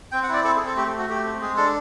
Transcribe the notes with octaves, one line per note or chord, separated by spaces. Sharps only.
C4 G5
F#5
E4 D5
C4 A4
G#4
C4 A4
A3 G4
G4
A3
F#4
A3 G4
C4
G#3 G#4
D4 A4